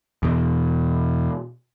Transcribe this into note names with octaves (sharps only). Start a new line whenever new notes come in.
E2 B2